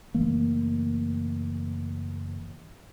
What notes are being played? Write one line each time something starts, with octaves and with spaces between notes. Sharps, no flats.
F#1 E3 A3 A#3